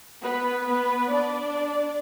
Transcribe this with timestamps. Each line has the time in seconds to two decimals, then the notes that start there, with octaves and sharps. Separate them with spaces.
0.22 B3 B4
0.67 B3 B4
1.12 D4 D5